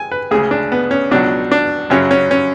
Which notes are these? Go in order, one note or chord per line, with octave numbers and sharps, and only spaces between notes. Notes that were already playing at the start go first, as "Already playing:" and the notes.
Already playing: G#3 G#5
B4
D2 C#3 G#3 G#4
D4
B3
C#4
C#2 B2 F#3 D4
D4
F#2 C#3 F#3 C#4
C#4
C#4